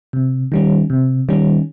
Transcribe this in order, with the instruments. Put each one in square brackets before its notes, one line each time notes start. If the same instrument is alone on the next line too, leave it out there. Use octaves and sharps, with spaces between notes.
[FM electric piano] C3
D#3 G3 C#4
C3
D#3 G3 C#4